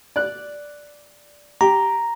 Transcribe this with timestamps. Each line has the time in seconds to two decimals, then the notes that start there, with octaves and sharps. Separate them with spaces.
0.16 D5 F#6
1.61 G4 A#5